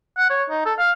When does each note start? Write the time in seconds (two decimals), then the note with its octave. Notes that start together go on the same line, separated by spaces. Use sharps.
0.17 F#5
0.30 C#5
0.50 D#4
0.66 A4
0.79 F5